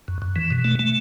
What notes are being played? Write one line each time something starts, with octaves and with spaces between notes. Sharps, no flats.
F#2
F#2
E3
B2
A3
A3